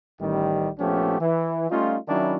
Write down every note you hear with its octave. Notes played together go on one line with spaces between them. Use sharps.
A1 D#3 G3
A#1 F3 A3 B3 C#4 G4
E3
G3 A3 C#4 D#4 F4
D#3 F#3 C#4 D4 E4